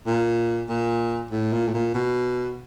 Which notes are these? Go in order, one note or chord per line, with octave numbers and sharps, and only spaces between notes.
A#2
A#2
A2
A#2
A2
A#2
B2